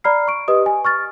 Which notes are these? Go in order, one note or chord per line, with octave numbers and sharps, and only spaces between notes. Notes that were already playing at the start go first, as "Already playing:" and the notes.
D5 A#5 B5 F6 C7
C#6 D7
G4 B4 D#5 D#6
G#5
C#6 F6 A6